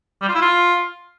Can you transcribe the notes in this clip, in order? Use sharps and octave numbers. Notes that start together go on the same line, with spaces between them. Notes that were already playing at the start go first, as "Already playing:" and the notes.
G3
F4
E4
F4